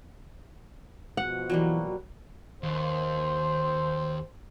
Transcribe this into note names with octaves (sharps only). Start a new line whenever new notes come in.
B2 F3 F#5
E3 F#3 G3 A#3
D#2 C5